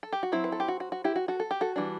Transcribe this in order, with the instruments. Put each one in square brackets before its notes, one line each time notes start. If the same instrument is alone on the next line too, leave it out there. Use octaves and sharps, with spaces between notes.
[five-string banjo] A4
G4
F#4
F#3 C4 E4
B4
A4
G4
F#4
F#4
F#4
E4 G4
F#4
F#4 A4
A4
G4
F#4 A4
E3 G3 D4